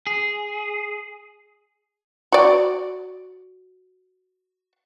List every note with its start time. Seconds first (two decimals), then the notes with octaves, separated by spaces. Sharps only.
0.07 G#4
2.32 F#4 D5